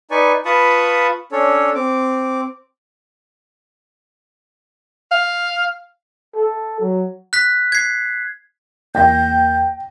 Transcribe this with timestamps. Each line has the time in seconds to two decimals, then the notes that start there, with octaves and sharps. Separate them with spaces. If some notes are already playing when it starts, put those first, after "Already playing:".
0.11 D#4 B4 D5 G#5 C#6
0.45 F4 B4 A5 B5 C#6 D#6
1.32 C#4 D4 A4 C#5
1.75 C4 D6
5.12 F5
6.35 A4
6.80 F#3
7.33 F#6 B6
7.72 G#6 C7
8.95 E2 A#3 G5 G6 A#6